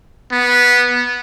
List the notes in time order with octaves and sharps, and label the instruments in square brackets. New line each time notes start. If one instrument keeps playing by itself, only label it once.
[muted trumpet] B3